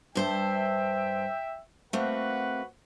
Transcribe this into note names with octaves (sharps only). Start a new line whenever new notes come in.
G2 C5 E5 G5 A5
A3 A#3 C4 F#4 B4 F#5